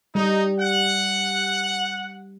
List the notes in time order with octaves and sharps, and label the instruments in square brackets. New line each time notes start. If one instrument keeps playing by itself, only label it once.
[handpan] G3 [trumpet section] D#4
[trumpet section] F#5